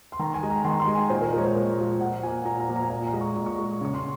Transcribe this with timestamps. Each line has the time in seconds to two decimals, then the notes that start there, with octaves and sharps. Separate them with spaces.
0.12 C6
0.19 D#3 A#5
0.34 G#5
0.43 G#3
0.50 A#5
0.64 D#3 C6
0.80 C6
0.87 G#3
0.95 G#5
1.10 A#2 C5
1.21 A#4
1.33 F3 A#4
1.36 G#3 C#5
1.44 C5
1.55 A#2
1.78 F3 G#3
2.00 A#2 F#5
2.23 F3 A#3 G#5
2.45 A#2 A#5
2.60 A#5
2.68 F3 A#3
2.76 A#5
2.83 G#5
2.90 A#2 A#5
3.06 A#5
3.13 G#3
3.21 C#6
3.36 A#2
3.46 C#6
3.58 G#3
3.81 C#3 C#6
3.94 C6